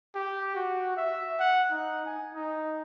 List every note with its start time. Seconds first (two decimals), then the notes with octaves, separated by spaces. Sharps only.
0.15 G4
0.55 F#4
0.97 E5
1.40 F#5
1.71 D#4
2.05 G#5
2.34 D#4